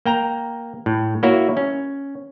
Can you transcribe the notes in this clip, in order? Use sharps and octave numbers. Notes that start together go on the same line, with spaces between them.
A#3 G5 A#5
A2
A#3 E4 F#4 C#5 E5
C#4